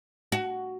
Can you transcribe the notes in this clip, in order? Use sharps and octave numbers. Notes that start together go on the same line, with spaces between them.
F#4